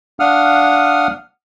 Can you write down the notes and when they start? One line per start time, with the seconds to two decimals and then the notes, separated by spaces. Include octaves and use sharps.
0.20 D4 F5 F#5 D#6 F6